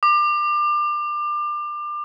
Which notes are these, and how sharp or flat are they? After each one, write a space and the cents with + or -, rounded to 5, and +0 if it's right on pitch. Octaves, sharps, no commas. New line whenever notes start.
D6 +30